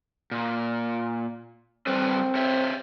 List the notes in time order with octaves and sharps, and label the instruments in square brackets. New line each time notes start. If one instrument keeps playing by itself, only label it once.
[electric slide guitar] A#2
[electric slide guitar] G3 A4 B4 [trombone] C4
[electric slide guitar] C5 C#5 E5